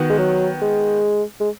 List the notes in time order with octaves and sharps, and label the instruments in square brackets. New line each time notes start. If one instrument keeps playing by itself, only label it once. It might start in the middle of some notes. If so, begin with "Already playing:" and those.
Already playing: [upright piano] D#3 B3 F#4
[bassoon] G#3
F#3
G#3
G#3